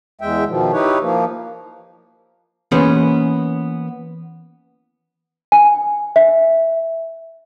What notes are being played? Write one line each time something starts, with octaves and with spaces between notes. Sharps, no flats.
E2 G#3 E5 G5
B2 D#3 F3
D#4 E4 G4 B4 C#5
F3 A#3
E3 A#3 B3 C#4 G#4 C5
G#5
E5